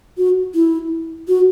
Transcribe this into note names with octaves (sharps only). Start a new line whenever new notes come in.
F#4
E4
F#4